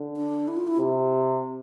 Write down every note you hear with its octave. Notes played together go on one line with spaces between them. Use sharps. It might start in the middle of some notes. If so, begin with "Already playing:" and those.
Already playing: D3
D4
E4
F4
E4
C3